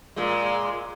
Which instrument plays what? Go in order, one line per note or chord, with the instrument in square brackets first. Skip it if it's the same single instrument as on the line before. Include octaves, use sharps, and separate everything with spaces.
[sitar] A#2 G#3